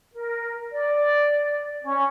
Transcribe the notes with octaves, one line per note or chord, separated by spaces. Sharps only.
A#4
D5
C#4